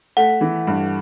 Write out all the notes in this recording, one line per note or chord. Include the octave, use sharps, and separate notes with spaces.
A3 F#5
E3
G2